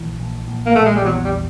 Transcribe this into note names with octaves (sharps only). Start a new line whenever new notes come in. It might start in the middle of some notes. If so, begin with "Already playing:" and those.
Already playing: A#1 E3
A#1
A#1
A#3
A#1 A3
G#3
G3
E2 F#3
G3